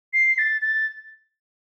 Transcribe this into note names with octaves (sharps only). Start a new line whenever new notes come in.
C7
A6
A6